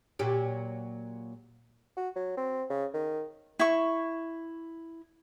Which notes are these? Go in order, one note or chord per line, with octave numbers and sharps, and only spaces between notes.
A#2 F#3 G4
F#4
F#3
C4
C#3
D#3
E4 C#6